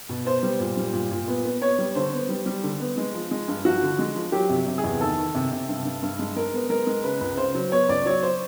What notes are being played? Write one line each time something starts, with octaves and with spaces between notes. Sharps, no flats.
B2
B3 C5
G3
A#2
G3
A#2
A#2
B3
B3
B3 C#5
G3
D3 C5
B3
G3
G3
D3
B3
G#3
F3
G#3
G2
F3 F#4
D3
G#3
F3
F#3 G4
C3
C3
G#4
E2
D#3 A4
D#3
C3
C3
G2
G2
G2
G#3
G#3 A#4
B3
G#3 A#4
G#3
C#3 B4
C#2
C#3 C5
F#3
B3 C#5
C#2 D5
F#3 C#5
C5